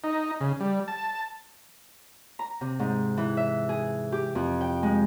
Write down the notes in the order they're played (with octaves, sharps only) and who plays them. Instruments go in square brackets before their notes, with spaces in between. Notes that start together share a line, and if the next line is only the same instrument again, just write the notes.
[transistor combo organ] D#4
C#3
G3
A5
[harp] A#5
C3
G#2
E3
E5
G#4
G4
F2
G5
G#3